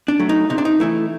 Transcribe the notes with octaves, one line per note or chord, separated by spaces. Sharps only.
D4
F#3 A3
D#4
C3 D#4
D4
D#4
E3 A3 E4